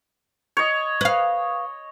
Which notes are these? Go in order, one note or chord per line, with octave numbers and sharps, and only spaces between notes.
C#5 D#5
B4 F5